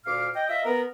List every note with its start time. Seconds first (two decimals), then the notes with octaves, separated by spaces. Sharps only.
0.05 D2 A#2 F5 D6 F6
0.35 D#5 G5
0.48 F4 D#5 E5
0.66 B3 A#4